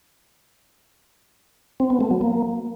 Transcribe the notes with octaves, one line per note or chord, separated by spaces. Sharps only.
C4
B3
A3
F#3
A#3